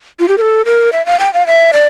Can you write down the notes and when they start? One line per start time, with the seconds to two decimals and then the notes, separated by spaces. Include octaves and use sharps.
0.20 F4
0.28 G4
0.38 A#4
0.41 A4
0.66 A#4
0.93 E5
1.06 F5
1.20 G5
1.34 F5
1.47 E5
1.73 D5